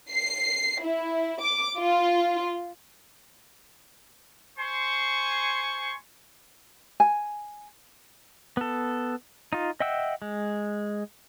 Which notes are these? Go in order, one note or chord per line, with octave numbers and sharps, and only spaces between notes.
C7
E4
D6
F4
C5 G#5 C6 C#6
G#5
B3 A4
D#4 F4
D#5 E5 F#5 G5 E6
G#3